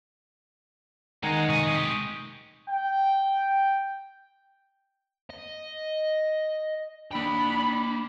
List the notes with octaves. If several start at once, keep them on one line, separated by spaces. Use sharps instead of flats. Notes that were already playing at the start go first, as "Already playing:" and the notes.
D#3 G#3 F#5 G#5 A#5 C7
C3 D#5 C#6 D#6
G#3 G4
G5
D#5
A#3 D4 G5 B5